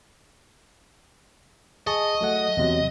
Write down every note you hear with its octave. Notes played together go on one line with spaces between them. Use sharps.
G#4 D#5 A5 C#6
F#3 A3 F#5
E2 C3 F#3